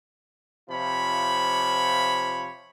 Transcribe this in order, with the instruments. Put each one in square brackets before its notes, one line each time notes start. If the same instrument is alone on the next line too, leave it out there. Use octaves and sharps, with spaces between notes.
[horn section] C3 F3 F4 C#5 B5